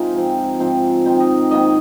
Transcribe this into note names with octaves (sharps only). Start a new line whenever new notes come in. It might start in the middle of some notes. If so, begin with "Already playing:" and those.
Already playing: C3 G#3 D#4 F4 G#4 A#4 C5
G#2 F3 C4
G#2 F3 C4 C5
D#3 C4 D#4 C5
D#5
G#2 D#3 A#3 D#5